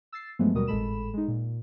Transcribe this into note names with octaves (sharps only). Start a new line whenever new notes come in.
E6 A6 C7
G2 F3 F#3 G#3 A3 B3
D#2 B2 G3 F#4 A#4 D#6
G#1 A2 G#3 A4 B5 E7
G#3 D#4
A#2